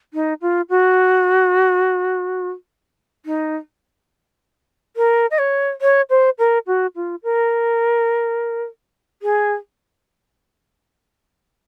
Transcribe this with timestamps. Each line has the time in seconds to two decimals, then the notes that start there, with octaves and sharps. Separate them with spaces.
0.14 D#4
0.42 F4
0.70 F#4
3.26 D#4
4.97 A#4
5.31 D#5
5.39 C#5
5.82 C#5
6.10 C5
6.39 A#4
6.67 F#4
6.96 F4
7.23 A#4
9.22 G#4